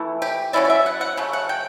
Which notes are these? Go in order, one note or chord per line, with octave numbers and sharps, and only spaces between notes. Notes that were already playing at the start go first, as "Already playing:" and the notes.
Already playing: E3 A3 E4
G4
F#3 C#4 E4 D5
D5
E5
F#5
F#5
C#3 F#3 A3
F#5
G5